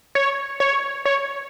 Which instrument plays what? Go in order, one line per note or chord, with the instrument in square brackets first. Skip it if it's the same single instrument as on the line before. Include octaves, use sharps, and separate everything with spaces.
[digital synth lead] C#5
C#5
C#5